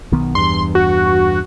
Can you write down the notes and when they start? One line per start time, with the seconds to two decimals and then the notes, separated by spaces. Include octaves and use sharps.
0.12 B1 D#3 B3
0.35 E2 G2 C6
0.75 F#4